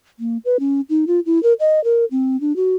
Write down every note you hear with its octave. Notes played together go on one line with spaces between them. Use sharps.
A#3
B4
C#4
D#4
F4
E4
A#4
D#5
A#4
C4
D4
F#4